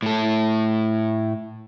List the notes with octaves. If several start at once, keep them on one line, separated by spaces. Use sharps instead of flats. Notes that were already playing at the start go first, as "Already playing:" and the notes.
A2 A4